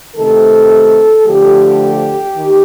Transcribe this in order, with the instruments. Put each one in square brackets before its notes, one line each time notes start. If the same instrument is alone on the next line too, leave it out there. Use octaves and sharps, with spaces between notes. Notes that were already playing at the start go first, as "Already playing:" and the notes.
[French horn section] C3 D#3 A3 C4 A4
D3 F3 A3 G4
D#3